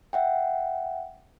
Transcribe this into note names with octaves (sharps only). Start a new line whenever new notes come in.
E5 F#5 G5